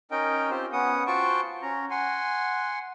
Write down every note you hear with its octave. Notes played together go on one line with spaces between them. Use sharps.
C#4 D#4 A#4 D#5 G5
C4 F4 G4 C5
B3 C#4 F#5 D#6
F4 F#4 C5 G5 A5 C#6
C#4 A#5
F#5 G#5 C6